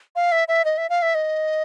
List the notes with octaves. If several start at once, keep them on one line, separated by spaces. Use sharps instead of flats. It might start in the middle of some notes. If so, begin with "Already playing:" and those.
F5
E5
E5
D#5
E5
F5
E5
D#5